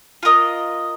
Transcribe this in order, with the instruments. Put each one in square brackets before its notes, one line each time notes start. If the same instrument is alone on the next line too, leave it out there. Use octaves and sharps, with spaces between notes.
[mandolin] F4 A#4 D#5